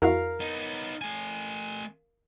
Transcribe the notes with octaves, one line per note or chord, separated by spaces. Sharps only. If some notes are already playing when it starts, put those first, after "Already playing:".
F2 E4 F#4 A#4 F5
B3 D#4
A3 G#5